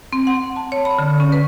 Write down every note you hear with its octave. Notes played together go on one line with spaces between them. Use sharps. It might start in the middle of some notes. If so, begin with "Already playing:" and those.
C4
F#5
A5
C#5
B5
D3
C#4
B4